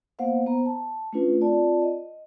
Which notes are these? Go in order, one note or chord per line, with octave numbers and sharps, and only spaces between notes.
A#3 B3 C5 F5 F#5
B3 C5 A#5
A5
A3 C#4 D4 F4 B4
C4 F4 D5 A5
D#5